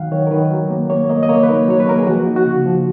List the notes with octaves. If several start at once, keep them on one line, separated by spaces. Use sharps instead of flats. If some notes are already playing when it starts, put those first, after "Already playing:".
Already playing: D#3 F#3 F5 F#5
D#3 C#5
A#4
D#3 B4
F#3
A#3
A#3 C#5
A#3 D#5
D#5
A#3 C#5
B4
D#4 A#4
F#3 C#5
B4
A#3 A#4
G#4
F3 F#4
D#4
F#4
C#3
F3